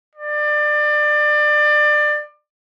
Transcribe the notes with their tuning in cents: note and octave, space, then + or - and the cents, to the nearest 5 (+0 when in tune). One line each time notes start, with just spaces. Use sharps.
D5 +25